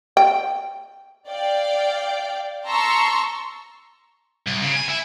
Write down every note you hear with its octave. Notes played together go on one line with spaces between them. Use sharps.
G5
D5 F5 G5
A5 A#5 C6 C#6 E6
C2
C#3
G#5
E4